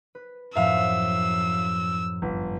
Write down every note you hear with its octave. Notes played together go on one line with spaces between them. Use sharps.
B4
F#2 A2 F3 E5 F5 E6
G1